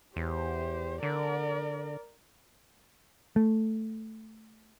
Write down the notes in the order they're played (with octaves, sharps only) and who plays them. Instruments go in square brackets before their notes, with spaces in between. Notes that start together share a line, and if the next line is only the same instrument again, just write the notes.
[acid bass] E2 [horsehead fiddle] G4 C5
[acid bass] D3 [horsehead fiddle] A#4 D5
[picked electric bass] A3